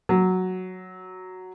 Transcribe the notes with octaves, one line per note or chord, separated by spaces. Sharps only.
F#3